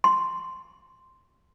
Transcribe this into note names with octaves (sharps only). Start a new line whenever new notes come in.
C6